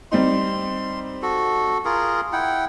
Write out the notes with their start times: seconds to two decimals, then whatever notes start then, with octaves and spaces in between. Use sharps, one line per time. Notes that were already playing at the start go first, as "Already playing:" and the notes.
0.12 G3 C4 D#4 C6
1.22 F#4 A4
1.85 F4 G#4 A#4
2.33 E4 F#5 G5